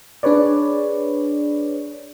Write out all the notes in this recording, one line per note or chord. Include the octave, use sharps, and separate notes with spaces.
D4 G#4 B4 C#5 D5